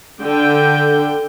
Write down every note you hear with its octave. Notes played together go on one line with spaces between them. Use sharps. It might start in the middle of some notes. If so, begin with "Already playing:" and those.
D3 G5